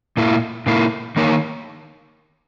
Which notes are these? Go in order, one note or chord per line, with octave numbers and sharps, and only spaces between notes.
A#2 A#3 E4
A#2 A#3 E4
D#3 A#3 D#4 A#4 C#5